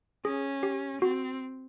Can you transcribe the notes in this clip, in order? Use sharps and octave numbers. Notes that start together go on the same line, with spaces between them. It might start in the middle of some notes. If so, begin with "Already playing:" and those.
C#4 G#4
G4
C4 F#4